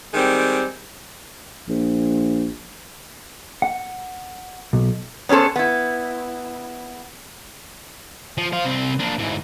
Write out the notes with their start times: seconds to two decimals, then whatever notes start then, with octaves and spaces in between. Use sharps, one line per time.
0.13 D#3 G3 G#3 C4
1.68 A#1
3.62 F#5
4.73 B1
5.29 B3 C#4 G#4 A4 C5
5.56 B3 E4
8.38 F3
8.53 C5 F5
8.65 C2 C4
9.00 A#3 D4
9.19 G#2 E3